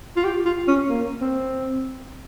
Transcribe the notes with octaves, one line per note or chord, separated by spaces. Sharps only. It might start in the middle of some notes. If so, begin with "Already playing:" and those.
F4
G4
F4
C#4
A#3
C4